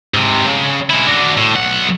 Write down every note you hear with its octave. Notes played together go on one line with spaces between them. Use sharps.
G#2 C3
C#3
G#3 E4
D4 F#4
A2
B1 F#5